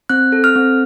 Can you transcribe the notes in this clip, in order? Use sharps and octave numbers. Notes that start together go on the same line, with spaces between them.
C4 F#6
A4
F6
C4